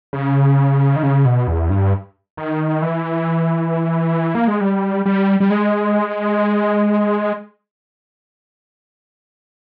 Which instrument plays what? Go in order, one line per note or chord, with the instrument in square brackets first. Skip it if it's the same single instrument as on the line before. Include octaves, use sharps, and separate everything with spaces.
[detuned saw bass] C#3
D#3
C#3
B2
E2
G2
D#3
E3
A#3
G#3
G3
G3
G3
G#3